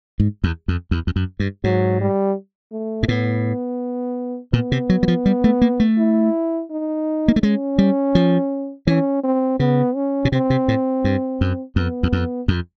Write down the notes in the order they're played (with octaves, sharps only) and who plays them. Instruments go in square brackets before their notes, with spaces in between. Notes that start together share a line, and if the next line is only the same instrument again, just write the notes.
[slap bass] G#2
E2
F2
E2
F2
F#2
G2
[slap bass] G#2 [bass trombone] F#3
[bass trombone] G3
A3
[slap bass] G#2
[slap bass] A2 [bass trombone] B3
[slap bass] A#2 [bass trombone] B3
[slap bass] C3
F#3
F#3
F3
G3
A3
A#3
A3
[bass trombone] E4
D#4
[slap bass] A#3
A3
[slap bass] G#3 [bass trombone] C#4
[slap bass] G3
F3
[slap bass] E3 [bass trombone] C#4
[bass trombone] C4
[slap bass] C#3 [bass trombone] B3
[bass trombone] C#4
[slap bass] B2
[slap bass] C3 [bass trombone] C4
[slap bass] C3
A2
G2
F#2
[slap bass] F2 [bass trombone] B3
[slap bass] E2
F2
F2